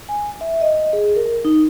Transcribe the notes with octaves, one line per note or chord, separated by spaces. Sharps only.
G#5
E5
D#5
G#4
A#4
D#4